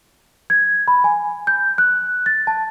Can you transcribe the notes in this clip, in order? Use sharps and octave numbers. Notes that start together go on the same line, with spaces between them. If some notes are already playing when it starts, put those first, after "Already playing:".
G#6
B5
G#5
G6
F#6
A6
A5